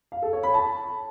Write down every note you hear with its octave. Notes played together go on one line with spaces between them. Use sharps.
F5
A4
C#5
B5
A5